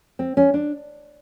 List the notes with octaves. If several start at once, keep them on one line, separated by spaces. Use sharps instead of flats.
C4
C#4
D4